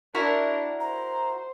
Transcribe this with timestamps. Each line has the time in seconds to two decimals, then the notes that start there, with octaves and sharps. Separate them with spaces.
0.15 D4 E4 F#4 A#4
0.80 C5 A#5